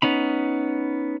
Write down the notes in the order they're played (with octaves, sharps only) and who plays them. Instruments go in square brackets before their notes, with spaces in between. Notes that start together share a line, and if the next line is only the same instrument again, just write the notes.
[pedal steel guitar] B3 C#4 D#4 B5